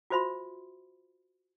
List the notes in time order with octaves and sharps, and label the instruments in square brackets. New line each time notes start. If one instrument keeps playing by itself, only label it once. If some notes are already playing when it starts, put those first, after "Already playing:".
[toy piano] F4 F#4 C5 E5 B5 C6